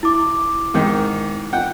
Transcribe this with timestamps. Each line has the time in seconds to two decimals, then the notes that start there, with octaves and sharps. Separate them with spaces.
0.03 E4 D6
0.74 G#2 D#3 G5
1.53 F#5 G5